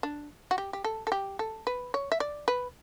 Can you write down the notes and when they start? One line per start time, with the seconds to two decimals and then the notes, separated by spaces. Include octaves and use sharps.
0.03 D4
0.51 F#4
0.58 G4
0.73 G4
0.84 A4
1.07 A4
1.12 G4
1.39 A4
1.67 B4
1.94 C#5
2.12 E5
2.20 D5
2.48 B4